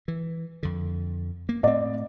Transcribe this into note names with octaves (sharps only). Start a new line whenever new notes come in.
E3
F2 D3
A#3
A2 B3 C4 D5 D#5